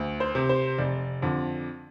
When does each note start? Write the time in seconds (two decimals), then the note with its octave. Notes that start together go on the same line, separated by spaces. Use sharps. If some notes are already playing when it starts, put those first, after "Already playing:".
Already playing: D2
0.20 C5
0.35 C3
0.49 C5
0.78 F1 D5
1.22 F2 D3